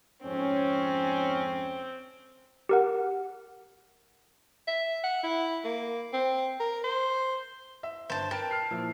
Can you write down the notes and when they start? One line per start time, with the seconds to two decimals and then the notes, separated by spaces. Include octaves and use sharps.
0.24 F2 G#2 C4 C#4
2.69 G4 A#4 F#5
4.67 E5
5.03 F#5
5.23 E4
5.64 A#3
6.13 C4
6.60 A#4
6.84 C5
7.83 E5
8.10 G1 C5 A5
8.31 A#4 B4 G5 A5
8.51 F6 C7
8.71 A#2 F3 E4